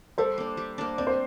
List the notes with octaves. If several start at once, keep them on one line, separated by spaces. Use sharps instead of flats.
G3 A4 C5
A#3 D4
G3
A#3 D4
C4 D5
C5